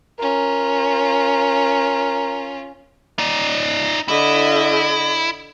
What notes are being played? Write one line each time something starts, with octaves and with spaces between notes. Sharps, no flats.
C#4 F4 A#4
D#4 D5
D3 E4 D#5